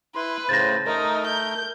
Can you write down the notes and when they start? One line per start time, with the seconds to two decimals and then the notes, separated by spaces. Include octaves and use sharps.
0.15 E4 B4 C6
0.49 A2 C#3 C5 A6 A#6
0.86 A3 D#4 A#4
1.27 G6